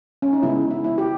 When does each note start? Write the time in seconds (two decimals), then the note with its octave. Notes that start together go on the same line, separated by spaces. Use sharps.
0.22 C#4
0.33 D#4
0.43 C#3 G#3 B3 E4
0.71 E4
0.84 E4
0.98 G4